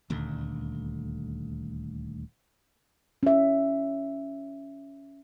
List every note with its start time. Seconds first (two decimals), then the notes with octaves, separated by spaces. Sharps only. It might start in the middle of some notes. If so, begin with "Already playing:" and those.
0.10 D#1 D2
3.23 C#4 E5